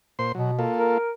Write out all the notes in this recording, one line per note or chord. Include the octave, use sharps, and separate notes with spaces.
A#2 C5 C6
B2 F#3
A#3 F4 A4
A#4